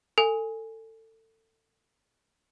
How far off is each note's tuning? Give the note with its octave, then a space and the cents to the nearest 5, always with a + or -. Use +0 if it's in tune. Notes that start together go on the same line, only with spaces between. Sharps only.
A4 +25 G#5 +0